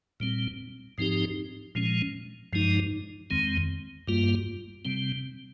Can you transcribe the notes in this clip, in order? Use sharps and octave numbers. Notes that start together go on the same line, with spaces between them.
A#2 G3 C4
G#2 F3 C4 D#4 G4
A#2 F3 G#3 C#4
G2 F3 G#3 D#4
F2 D#3 G#3 C4
G2 G3 A#3 F4
C3 G3 C4